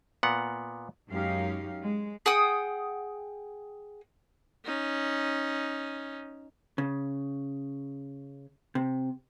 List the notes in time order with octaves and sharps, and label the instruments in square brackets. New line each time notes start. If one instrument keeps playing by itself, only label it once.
[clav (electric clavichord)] A#2 B3 A#4 F#5
[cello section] F#2 G#3 C#4 D#4 G4 F5
G#3
[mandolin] G#4 F#5 G5 D#6
[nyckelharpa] C#4 D#4
[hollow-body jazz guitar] C#3
C3